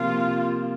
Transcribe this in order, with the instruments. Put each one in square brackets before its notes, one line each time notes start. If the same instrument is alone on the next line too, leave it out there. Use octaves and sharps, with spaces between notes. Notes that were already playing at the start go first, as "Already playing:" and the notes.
Already playing: [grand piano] C3 F3 A#3 [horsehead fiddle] F4